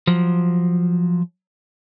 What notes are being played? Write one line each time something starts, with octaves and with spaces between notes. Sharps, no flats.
F3 F#3